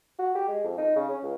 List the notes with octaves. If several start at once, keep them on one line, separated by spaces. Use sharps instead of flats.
F#4
G4
G#3
F2
D#4
C#3
C#4
C#2